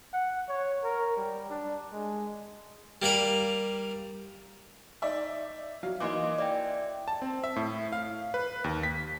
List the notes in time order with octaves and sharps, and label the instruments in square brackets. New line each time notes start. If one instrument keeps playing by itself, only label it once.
[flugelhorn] F#5
C#5
A#4
G3
D4
G#3
[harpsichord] G3 A#3 A#5 B5
[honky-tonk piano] D#4 D5 E5
F#3 F5
[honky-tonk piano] E3 A#3 D#4 [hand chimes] D#5 C6 D6
[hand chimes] D5 E5 G5
[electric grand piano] A5
C4
E5
A2
F5
B4
D#2
B6